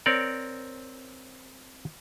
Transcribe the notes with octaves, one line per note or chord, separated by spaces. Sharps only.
C4 A#4 C#5 D5